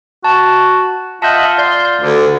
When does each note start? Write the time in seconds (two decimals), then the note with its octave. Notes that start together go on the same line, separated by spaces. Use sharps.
0.24 F#4 A5
1.22 F4 D#5 E5 F#5 A5 G6
1.58 D5 C6 G6
2.01 D2 D3